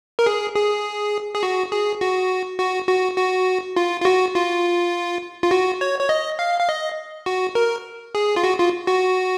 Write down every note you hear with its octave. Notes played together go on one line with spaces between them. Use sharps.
A#4
G#4
G#4
G#4
F#4
G#4
F#4
F#4
F#4
F#4
F4
F4
F#4
F4
F4
F#4
C#5
C#5
D#5
F5
F5
D#5
F#4
A#4
G#4
F4
F#4
F4
F#4